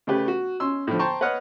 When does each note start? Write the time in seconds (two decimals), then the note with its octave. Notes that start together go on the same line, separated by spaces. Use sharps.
0.07 C#3 A3 C#4 G4 B4
0.28 F#4
0.60 C#4 C6 E6
0.87 A2 D3 F3
0.99 C5 G5 A5 A#5 C6 C#6
1.21 B4 C#5 D#5 F#5 F6